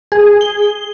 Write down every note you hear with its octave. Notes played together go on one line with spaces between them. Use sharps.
G#4
G7